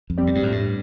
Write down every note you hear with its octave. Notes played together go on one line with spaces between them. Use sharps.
F2
G3 C4 G4 D5
A2
G2
F2 A2
G2